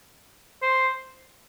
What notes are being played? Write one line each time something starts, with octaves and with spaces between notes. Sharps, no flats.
C5